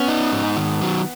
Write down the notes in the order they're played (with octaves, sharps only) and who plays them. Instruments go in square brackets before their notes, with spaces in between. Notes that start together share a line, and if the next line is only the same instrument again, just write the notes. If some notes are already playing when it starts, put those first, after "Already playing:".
Already playing: [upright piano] B3 [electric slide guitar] C#4
[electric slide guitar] D#4
G#2
D#3
F#3